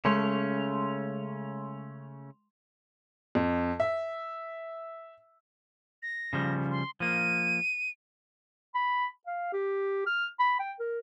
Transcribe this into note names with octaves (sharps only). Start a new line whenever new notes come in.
C#3 G#3 A3 C#4 C6 F7
F2
E5
A#6
C#3 F3 G3
C6
F3 A#3 D#7
B5
F5
G4
F6
B5
G5
A#4